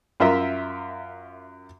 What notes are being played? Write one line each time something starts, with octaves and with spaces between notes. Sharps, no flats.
F#2 F4 A#4 E5